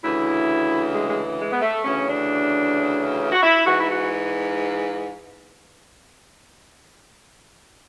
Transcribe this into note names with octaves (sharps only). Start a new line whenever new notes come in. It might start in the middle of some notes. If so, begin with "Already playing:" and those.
D2 C#3 E3 E4
G#3
G#3
G#3
B3
A3
D2 C#3 E3 C#4
D4
F#4
E4
G#2 E3 F#4
E4
F#4